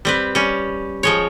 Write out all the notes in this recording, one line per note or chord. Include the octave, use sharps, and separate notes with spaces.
G3 C4 B4
G3 C#4
F3 G#3 C#5